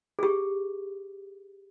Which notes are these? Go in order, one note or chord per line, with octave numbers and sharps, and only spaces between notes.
G4 G#4